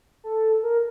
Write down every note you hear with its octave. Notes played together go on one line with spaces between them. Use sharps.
A4
A#4